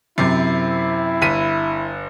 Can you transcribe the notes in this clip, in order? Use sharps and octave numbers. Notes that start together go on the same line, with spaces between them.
F#2 C3 E4
G1 B6 D#7